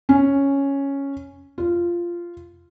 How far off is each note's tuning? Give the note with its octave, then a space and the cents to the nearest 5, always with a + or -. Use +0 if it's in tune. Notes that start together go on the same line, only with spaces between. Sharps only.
C#4 +0
F4 -10